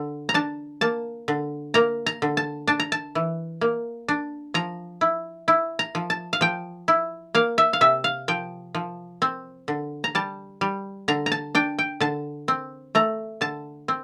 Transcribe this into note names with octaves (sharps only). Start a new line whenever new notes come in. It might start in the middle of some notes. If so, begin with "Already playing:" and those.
Already playing: D3
A#5
D4 A5
A#3 A5
D3
A#3 A#5
A#5
D3
A5
D4 A5
A#5
A5
E3
A#3
D4
F3 A#5
E4
E4
A#5
F3
A5
F5
F3 G5
E4
A#3 F5
E5
F5
C3 E5
F5
F3 G5
F3
C4
D3
A#5
G3 A5
G3
D3 A#5
A#5
A5
D4 G5
G5
D3 A5
C4
A3 A#5
D3 A5
C4